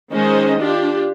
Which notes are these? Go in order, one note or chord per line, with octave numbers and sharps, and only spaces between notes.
D#3 G#3 C#4 C5 D#5
D4 F4 G4